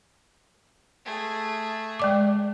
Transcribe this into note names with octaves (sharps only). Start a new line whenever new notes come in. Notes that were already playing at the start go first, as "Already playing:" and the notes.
A3 G#4
G#3 D5 D6